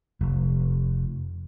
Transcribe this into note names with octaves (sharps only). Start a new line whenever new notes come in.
F1